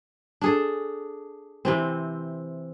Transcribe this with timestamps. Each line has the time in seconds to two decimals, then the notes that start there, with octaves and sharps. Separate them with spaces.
0.42 D4 G#4 A4
1.65 C3 E3 C4